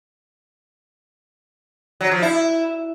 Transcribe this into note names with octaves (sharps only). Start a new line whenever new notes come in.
F#3
F3
E4